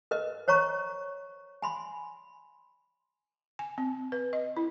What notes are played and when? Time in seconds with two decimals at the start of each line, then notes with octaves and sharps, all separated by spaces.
0.11 A#4 B4 D#5
0.48 C5 C#5 A#5 C#6
1.62 G#5 B5 C6
3.59 G#5
3.78 C4
4.12 B4
4.33 D#5
4.57 E4